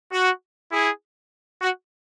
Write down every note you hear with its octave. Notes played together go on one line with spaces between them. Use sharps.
F#4
E4 G#4
F#4